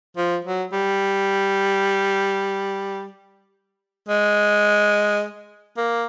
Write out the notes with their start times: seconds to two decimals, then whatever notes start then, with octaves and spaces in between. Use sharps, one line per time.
0.17 F3
0.44 F#3
0.72 G3
4.08 G#3
5.77 A#3